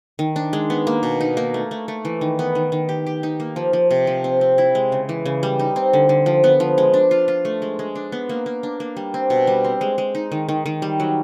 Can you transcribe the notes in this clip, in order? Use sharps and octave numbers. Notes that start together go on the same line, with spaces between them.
D#3
D4
G#3
B3
A#3
B2
D#4
A#3
A3
A3
A3
E3
D#3
B3
D#3
D#3
G4
G4
D#4
A#3
F3
F3
C3
F3
C4
C4
E4
G#3
C#3
E3
C#3
G3
D#4
C4
D3
D3
F3
B3
F3
G#3
D4
F4
F4
A3
G#3
G#3
D4
B3
A#3
A#3
D4
A#3
G3
C4
B2
G3
C4
G#3
G#3
D#4
D#3
D#3
D#3
G3
F#3